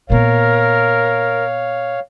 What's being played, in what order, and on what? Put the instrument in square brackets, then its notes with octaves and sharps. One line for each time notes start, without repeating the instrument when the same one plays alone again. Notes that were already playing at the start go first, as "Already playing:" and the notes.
[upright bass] A#2 B3 [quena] A#4 [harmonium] C#5 F5